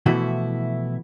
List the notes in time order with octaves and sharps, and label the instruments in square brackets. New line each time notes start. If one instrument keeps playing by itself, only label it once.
[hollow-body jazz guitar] B2 E3 F3 A3 E4 F#4